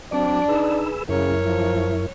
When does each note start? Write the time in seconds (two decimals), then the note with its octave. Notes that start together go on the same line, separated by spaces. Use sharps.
0.12 F#3 C4 D4 D5 D6
0.48 D#4 G#4 B4 E6
1.09 F#2 C#3 E4 A#4 C#5
1.44 F3